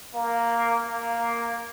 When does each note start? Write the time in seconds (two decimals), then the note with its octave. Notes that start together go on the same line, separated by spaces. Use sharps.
0.14 A#3
0.87 A#3